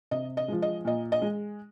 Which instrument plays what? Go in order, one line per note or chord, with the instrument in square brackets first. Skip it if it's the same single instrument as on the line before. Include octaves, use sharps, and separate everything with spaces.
[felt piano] C3 D#5
D#5
F3 G#3
D#5
A#2 D#5
D#5
G#3